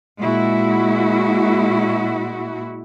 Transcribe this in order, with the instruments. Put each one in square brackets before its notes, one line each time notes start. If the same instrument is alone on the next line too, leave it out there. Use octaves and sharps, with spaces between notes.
[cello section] A#2 G#3 E4 F#4